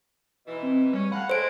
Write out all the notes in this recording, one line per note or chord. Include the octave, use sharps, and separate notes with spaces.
G#2 B2 E3
C4
G3 C#4
A2 F5 F#5 B5
G#3 A3 C5 C#5 D7